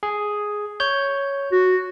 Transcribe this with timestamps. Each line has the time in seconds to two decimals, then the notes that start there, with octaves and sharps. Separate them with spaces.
0.03 G#4
0.80 C#5 G6
1.52 F#4